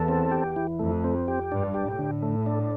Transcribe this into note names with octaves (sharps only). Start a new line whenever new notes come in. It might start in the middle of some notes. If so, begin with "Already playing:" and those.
Already playing: E2 A4
C4
G4
E3
F2 A3
C4
G4
G2 D4
G4
A2
D3
A3
D4